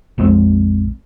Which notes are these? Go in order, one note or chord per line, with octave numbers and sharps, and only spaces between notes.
A#1 F2 G#3 C4